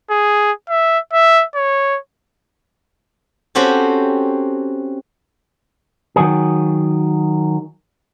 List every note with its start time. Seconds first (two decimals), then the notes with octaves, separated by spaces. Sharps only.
0.11 G#4
0.69 E5
1.13 E5
1.55 C#5
3.55 C4 C#4 F#4 G4 A4
6.16 D#3 F#3 G#4